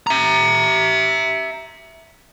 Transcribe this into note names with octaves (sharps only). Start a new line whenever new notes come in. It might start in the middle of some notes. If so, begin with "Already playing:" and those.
E5 A#5